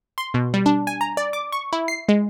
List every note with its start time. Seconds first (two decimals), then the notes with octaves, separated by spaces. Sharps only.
0.18 C6
0.34 B2
0.54 G3
0.66 D4
0.87 G#5
1.01 A#5
1.17 D5
1.33 D6
1.52 C#6
1.73 E4
1.88 C7
2.09 G#3